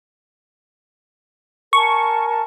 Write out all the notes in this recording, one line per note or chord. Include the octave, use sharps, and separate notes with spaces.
A#4 G#5 A5 C#6